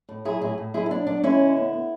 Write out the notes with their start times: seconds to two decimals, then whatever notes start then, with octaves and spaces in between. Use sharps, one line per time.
0.09 A2
0.25 F#3 E4 G#4
0.41 A2 E4 G#4
0.58 A2
0.74 F#3 E4 G#4
0.86 E4
0.90 B3 D4
1.06 F#3 D4
1.23 G#3 C#4 E4
1.40 D3
1.57 B3
1.73 B3